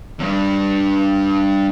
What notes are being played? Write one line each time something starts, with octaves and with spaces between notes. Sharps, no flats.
E2 G2